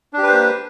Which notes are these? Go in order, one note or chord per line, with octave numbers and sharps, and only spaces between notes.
A#3 D4 G4 B4 C5